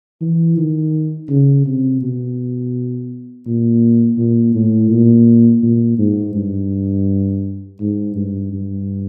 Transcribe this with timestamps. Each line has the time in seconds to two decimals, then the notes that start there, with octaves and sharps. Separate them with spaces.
0.21 E3
0.57 D#3
1.29 C#3
1.66 C3
2.02 B2
3.47 A#2
4.18 A#2
4.55 A2
4.91 A#2
5.63 A#2
5.99 G#2
6.35 G2
7.80 G#2
8.15 G2
8.53 G2